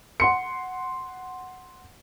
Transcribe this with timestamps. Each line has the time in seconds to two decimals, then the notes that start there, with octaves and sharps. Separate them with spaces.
0.20 F#5 C6 C#7